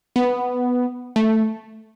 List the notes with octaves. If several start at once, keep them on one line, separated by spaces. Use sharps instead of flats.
B3
A3